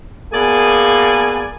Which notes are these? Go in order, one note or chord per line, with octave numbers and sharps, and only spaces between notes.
B2 A#3 G#4 D5 G#5